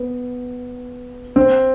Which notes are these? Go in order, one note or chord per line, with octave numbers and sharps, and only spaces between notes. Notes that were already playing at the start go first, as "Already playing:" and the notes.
Already playing: B3
C4